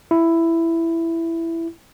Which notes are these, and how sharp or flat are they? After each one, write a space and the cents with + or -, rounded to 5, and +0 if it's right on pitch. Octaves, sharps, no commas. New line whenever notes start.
E4 +10